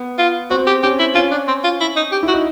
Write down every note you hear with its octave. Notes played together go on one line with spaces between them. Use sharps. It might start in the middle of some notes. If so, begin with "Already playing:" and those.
Already playing: B3
F4
C4 F#4
G4
C#4 G4
E4
C#4 F4
D4
C4
F4
E4
D#4
G4
E4
F#4
D#4